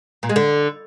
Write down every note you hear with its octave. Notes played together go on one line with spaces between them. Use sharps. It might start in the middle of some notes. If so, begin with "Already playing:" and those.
A#2
G#3
D3